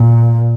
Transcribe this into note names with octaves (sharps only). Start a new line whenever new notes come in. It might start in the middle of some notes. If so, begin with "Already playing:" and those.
Already playing: A#2